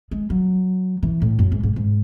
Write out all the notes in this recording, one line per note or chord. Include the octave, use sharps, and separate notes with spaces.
G#3
F#3
E3
A2
F#2
G#2
G#2
G#2